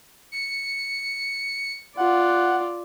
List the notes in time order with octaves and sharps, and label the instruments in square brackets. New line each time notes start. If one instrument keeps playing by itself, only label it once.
[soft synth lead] C#7
[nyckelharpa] F4 D5 [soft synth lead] F#5